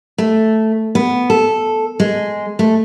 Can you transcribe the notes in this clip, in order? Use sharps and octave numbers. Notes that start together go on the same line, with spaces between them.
A3
B3
A4
G#3
A3